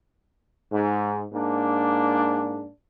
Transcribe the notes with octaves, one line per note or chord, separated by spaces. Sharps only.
G#2
G#2 A#3 D4